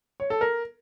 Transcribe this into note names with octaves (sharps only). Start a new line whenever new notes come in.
C#5
A4
A#4